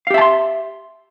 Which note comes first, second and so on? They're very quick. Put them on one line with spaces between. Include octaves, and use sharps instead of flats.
F5 G4 E5 A5 C6